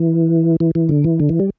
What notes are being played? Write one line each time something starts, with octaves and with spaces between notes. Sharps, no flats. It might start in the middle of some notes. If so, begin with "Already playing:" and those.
Already playing: E3
E3
E3
D3
E3
D3
E3
G3